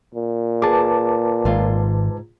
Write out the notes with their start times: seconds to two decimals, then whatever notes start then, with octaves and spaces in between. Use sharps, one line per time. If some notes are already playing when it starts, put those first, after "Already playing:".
0.15 A#2
0.62 G#4 B4 A5 D6
1.45 G#1 G#2 F4